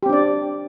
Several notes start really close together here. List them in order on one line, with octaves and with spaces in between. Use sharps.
G4 C4 D4 D5